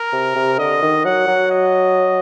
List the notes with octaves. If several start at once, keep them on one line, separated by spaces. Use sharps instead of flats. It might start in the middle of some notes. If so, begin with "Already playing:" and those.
Already playing: A#4
C3
C3
D3 D#5
D#3
F#3 F#5
F#3
D#5